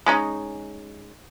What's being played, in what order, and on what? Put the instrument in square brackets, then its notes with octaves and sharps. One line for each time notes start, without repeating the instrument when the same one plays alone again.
[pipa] G#3 C#4 D#4